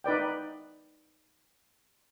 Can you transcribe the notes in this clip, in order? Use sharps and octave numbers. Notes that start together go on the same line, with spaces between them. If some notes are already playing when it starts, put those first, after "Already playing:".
D#4 B4 D5 G5